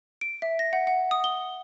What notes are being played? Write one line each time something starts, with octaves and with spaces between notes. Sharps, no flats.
D7
E5
A#6
F#5
F#5
D#6
G7